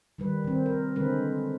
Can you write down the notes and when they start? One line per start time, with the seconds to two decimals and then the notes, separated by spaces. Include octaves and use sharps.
0.18 D#3 G3 B4
0.44 D#3 C4
0.66 A#4
0.96 D3 G#3 C4 B4